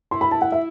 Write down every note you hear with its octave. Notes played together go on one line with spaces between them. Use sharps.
E4 C6
B5
A5
F#5
E5